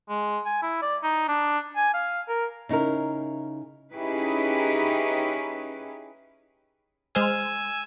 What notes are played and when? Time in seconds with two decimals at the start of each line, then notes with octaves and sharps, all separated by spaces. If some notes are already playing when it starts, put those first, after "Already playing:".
0.09 G#3
0.46 G#5
0.63 E4
0.82 D5
1.03 D#4
1.28 D4
1.76 G#5
1.94 F5
2.29 A#4
2.69 C#3 D#4 E4 A#4
3.93 C#4 D#4 E4 G4 G#4 B4
7.15 G#3 C5 G#5 E6 F6